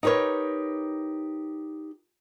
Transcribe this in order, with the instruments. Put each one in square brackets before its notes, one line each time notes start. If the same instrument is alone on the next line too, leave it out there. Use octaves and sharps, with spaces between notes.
[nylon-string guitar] D#4 G4 A#4 B4 C#5